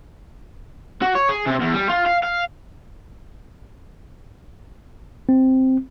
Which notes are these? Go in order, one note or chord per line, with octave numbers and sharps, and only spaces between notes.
F#4
C#5
G#4
C3
E2
G3
F4
F5
F5
C4